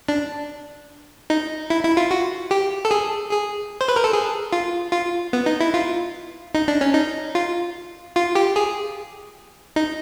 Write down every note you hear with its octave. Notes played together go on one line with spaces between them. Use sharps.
D4
D#4
E4
E4
F4
F#4
G4
A4
G#4
G#4
C5
B4
A#4
A4
G#4
F4
F4
B3
D#4
E4
F4
D#4
D4
C#4
D#4
F4
F4
G4
G#4
D#4